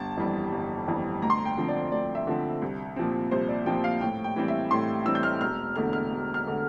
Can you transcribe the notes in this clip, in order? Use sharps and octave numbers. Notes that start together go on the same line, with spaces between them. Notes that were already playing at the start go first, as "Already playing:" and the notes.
Already playing: G1 A5
F2 E3 G3
G1
F2 E3 G3
D2 A#5
C6
A#5
G5
D3 F3 C4
D5
D2 D5
E5
D3 F3 C4
C2
A#2 F3 C4
C2 C5
D5
A#2 F3 C4 G5
F5
A2 G5
G5
E3 G3 C4
E5
A2 C6
E3 G3 C4 E6
G6
F6
E1 F6
E2 D3 A3 F6
F6
E1
F6
D3 A3